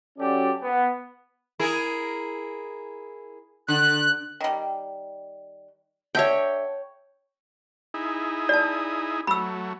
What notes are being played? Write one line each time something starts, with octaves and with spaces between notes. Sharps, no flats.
F#3 C#4 F#4 G4 A4 D5
B3
E4 G#4 A#4
D3 F#6
D#3 G3
D3 C#5 E5 G5
D#4 E4 G#4
D5 A5
F#3 A3 B5 E6